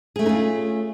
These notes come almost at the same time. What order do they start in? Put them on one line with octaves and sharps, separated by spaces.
G#4 A3 C#4 D#4 F4